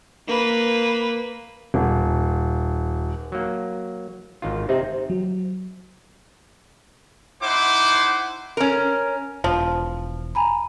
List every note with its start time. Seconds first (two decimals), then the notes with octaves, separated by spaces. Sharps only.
0.28 A#3 B4
1.74 D#1
3.32 F#3 A#3
4.42 G#1 D#3 F4
4.69 C3 C4 D#4
5.10 F#3
7.43 D#4 E4 C5 F#5 D6
8.57 C#4 A#4
9.44 E1 F3
10.35 G#5 A#5 B5